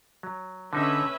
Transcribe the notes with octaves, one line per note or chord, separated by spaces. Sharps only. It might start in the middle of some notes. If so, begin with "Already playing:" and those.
F#3
D3 C#4 D#4 B4 E5